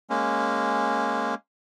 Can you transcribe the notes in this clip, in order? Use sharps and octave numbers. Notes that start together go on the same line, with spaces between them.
G#3 A#3 C#4